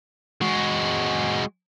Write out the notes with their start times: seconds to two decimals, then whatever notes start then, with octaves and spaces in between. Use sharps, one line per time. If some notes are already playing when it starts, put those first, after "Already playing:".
0.41 G#3 F#4